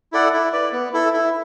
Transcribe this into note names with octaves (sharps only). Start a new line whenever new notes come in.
E4 A4 D5 F#5
E4
B4 D5
B3
E4 A4
E4